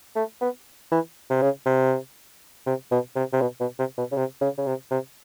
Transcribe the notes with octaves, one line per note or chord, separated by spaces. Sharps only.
A3
B3
E3
C3
C#3
C3
C3
B2
C3
C3
B2
B2
C3
B2
C#3
C3
C#3
C#3
C3
C3